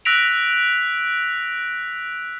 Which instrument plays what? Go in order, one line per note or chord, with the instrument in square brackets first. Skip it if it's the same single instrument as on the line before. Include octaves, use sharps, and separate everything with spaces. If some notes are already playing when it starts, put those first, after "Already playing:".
[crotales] E6 F#6 A#6 B6 D7 F7